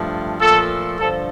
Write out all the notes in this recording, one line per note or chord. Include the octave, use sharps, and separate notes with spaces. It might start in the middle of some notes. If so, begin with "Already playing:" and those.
Already playing: G2 F3 A3
A#2 F3 A3 A4
G2 D3 F3 A4